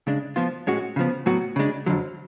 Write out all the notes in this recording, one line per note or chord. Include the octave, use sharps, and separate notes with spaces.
C#3 G#3 D4
F3 B3 F4
A2 G#3 C#4 F#4
C#3 F3 B3
A2 F#3 B3 F#4
C#3 G#3 D4
F2 D3 F#3